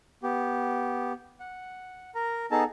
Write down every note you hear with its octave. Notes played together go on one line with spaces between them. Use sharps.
B3 G4
F#5
A#4 A#5
B3 D#4 G#4 A4 A5 A#5